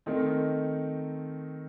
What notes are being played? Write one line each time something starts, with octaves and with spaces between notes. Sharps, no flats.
D#3 A3 C4 D#4 A#4